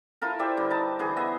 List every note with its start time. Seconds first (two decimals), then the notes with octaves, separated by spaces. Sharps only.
0.22 E4 F4 A4 A#4
0.39 G4 C5 D5 E5
0.57 G2 D3
0.70 D#4 A5
0.99 D3 E3 G#4
1.16 B3 D#5 E5